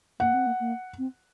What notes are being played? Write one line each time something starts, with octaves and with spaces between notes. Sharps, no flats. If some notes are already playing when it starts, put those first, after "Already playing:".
A#3 F#5
C4
A#3
A#3
C4